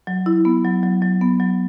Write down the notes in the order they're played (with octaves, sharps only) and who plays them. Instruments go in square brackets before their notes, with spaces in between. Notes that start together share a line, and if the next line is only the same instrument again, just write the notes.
[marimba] F#3
E4
B3
F#3
F#3
F#3
B3
F#3